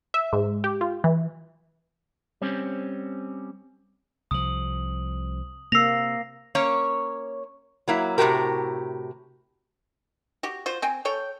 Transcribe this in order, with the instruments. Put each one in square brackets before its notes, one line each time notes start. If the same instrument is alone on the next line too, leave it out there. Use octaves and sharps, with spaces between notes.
[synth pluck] E5
G#2
G4
F4
E3
[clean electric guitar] G3 C4 C#4
[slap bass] C2 F3 [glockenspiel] D#6 F#7
[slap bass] C3 [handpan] A#3 [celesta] E6 F7 [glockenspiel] A#6 C7
[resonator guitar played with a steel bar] A#3 C#4 C#5
F#3 A#3 E4
A2 C3 E3 F#4 G4 A#4
[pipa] F#4 G4
F4 F#4 C5
C4 G5 G#5
A4 C#5 G5